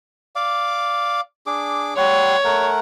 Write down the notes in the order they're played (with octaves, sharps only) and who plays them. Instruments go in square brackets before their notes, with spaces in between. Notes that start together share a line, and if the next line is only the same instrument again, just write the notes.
[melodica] D5 F5 D6
D4 G#4 D6
[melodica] G3 F#5 C6 [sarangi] C#5
[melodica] A3 A#4 F#5